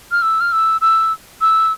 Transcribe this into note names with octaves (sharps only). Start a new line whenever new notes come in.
F6
E6
F6
E6
E6
E6